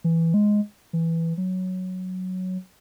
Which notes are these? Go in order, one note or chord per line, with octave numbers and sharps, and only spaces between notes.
E3
G#3
E3
F#3